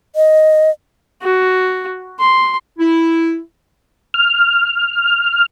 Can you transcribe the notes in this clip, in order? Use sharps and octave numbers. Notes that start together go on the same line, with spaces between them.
D#5
F#4
C6
E4
F6